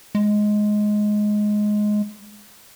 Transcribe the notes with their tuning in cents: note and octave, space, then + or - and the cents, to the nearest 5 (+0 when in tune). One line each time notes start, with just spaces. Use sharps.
G#3 +10